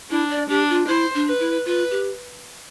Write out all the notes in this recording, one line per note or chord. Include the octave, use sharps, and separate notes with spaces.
D4 E4
D5
D4 G4
F4
E4 C5
D4
B4
E4
F4 B4
G4